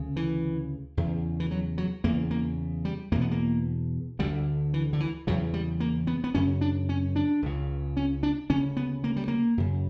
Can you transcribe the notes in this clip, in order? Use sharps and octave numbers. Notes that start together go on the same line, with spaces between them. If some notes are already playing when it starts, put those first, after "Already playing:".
Already playing: D2 C#3
E3
E2 C#3
E3
F#3
F#3
E2 C#3 A#3
A#3
G3
E2 B2 A#3
B3
A#3
D2 D3 G3
E3
D3
E3
E2 C#3 F#3
G3
A#3
B3
B3
F#2 C#3 C#4
D4
C#4
D4
C#2 C#3
C#4
D4
D2 C#3 C#4
B3
A#3
G3
A#3
F#2 C#3